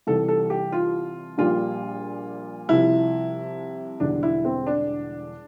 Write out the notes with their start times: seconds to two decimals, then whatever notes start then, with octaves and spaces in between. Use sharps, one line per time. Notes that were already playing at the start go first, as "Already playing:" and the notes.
0.07 C2 C3 E3 G3 A4
0.28 A4
0.50 G4
0.72 F4
1.38 A#1 A#2 G3 F4
2.69 C2 C3 F3 E4
4.00 E1 E2 D3 G3 D4
4.23 E4
4.45 C4
4.67 D4